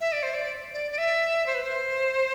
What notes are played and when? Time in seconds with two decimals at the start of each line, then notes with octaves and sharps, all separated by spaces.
0.01 E5
0.12 D5
0.23 C5
0.34 D5
0.74 D5
0.91 D5
0.98 E5
1.46 C5
1.55 B4
1.63 C5